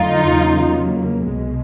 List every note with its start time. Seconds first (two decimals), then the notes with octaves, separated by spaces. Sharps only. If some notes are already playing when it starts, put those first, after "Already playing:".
Already playing: F2 D3 F#3 A3 D#4 F4
0.29 E2 C#3 F#3 A#3
1.26 C2 B2 G#3